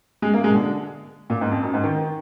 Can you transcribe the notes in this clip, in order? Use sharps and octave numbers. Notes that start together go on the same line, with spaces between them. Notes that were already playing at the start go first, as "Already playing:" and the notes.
G#3
A#3
G#3
B2
D3
A#2
G#2
F2
F#2
G#2
D#3